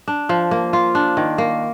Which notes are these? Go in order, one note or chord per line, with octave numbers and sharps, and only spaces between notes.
D4
F3
A#3
F4
D4
D#3
A#3